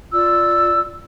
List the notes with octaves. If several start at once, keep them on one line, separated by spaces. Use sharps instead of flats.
F4 D5 E6